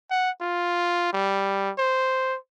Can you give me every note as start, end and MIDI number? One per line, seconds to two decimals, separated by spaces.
0.11 0.30 78
0.41 1.12 65
1.13 1.71 55
1.78 2.37 72